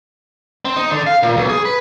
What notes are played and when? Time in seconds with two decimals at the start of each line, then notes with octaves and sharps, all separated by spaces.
0.65 C4
0.76 D#4
0.91 D3
1.07 F5
1.23 A#2
1.37 B1
1.49 G#4
1.65 B4